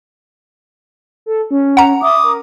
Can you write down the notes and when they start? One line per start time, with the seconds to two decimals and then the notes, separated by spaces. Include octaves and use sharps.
1.26 A4
1.51 C#4
1.77 F#5 A#5
2.02 E5 D6 D#6
2.24 A#4